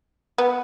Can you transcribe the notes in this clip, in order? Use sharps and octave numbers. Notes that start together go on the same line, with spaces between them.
B3